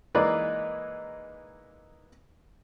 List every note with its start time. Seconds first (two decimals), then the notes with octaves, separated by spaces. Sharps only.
0.15 E3 G#3 A#3 D#4 B4 D5